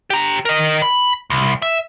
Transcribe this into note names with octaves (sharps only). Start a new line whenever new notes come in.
G4 A#5
A#4 D#5
B5
C2
E5